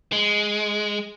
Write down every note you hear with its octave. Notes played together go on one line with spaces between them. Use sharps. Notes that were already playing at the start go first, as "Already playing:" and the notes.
G#3